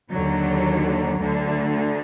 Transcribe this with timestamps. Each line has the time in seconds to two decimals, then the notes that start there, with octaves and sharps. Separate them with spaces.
0.11 D#2 D3 F#3
1.20 D2 D3